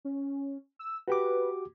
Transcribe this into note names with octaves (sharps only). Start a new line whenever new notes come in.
C#4
E6
F#4 G4 B4 D6